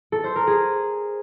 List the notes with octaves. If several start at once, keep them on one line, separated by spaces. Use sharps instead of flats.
A4
C5
A#4
G#4